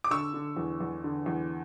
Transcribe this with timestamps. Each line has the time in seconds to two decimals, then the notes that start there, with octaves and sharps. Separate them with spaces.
0.04 D6
0.11 D3 C#6 E6
0.34 D3
0.57 E2
0.81 E2
1.04 D3
1.26 E2